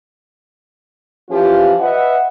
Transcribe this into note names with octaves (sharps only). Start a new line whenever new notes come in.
E3 F3 C#4 F4 G4
B4 D#5 E5 F#5